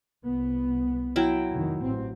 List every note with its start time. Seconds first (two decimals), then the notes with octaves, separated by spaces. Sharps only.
0.24 C2 B3
1.16 F#3 E4 G5
1.51 F1 D#3
1.82 A1 C4